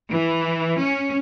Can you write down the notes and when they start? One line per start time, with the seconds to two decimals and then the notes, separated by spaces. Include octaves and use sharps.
0.11 E3
0.79 C#4